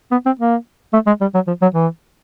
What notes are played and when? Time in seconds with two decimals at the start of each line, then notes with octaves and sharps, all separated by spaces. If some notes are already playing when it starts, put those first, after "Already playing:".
0.11 B3
0.26 C4
0.39 A#3
0.93 A3
1.07 G#3
1.21 G3
1.34 F#3
1.47 F3
1.62 F#3
1.74 E3